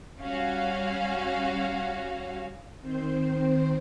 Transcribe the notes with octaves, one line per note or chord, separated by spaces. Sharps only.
G3 C#4 F#4 F5
D#3 C4 C5